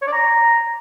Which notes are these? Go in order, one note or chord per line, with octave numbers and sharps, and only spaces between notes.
C#5
D5
A#5